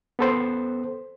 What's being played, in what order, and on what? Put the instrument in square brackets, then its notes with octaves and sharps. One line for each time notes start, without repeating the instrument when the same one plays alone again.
[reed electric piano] B3 A4 C5